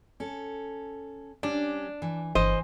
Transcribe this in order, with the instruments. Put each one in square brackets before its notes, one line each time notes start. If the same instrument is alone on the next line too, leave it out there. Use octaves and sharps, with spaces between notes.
[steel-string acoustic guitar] C#4 A4
[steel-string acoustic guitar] G3 C#4 [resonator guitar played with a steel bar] D4
[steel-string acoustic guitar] E3
[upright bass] G1 [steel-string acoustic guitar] E3 [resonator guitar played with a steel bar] C5 D#5